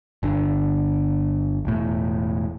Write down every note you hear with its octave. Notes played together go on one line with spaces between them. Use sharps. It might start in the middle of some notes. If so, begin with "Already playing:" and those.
G1 D3
E1 A2